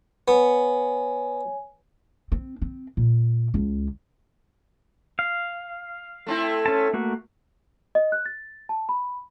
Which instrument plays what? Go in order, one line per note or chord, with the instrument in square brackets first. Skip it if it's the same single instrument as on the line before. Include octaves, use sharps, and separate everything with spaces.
[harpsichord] B3 [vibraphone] C#5 G#5
[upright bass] C4
C4
A#2
C#2
[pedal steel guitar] F5
[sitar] A3 C4 E4
[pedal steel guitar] C#4 A5
A3 A#3 F#4
[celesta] D#5
F#6
A6
A5
B5